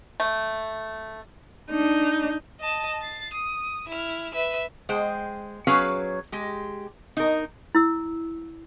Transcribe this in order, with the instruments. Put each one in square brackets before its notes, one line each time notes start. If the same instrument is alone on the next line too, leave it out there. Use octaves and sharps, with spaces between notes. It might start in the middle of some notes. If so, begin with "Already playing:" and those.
[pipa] A3
[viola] D4 D#4
[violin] D#5 A5
A6 C7
D#6
E4 F6
B4 E5
[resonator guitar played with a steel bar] G#3 C5 G5
F#3 C#4 G#4 B4 C#5 F5
G#3 G4
D#4 A#4
[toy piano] E4 E6